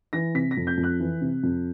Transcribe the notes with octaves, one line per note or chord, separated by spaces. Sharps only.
E3 A#6
C3 B6
A#6
F2
G6
F2
F#6
E3
C3
F2